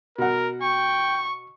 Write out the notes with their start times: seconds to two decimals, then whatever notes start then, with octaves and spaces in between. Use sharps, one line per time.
0.18 B2 A#4 F#5
0.62 G5 C#6